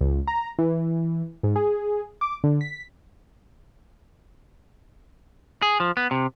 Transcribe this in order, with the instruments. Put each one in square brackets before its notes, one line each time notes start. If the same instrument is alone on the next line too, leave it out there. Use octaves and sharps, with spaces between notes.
[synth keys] C#2
A#5
E3
G#2
G#4
D6
D3
B6
[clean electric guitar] G#4
F3
B3
C3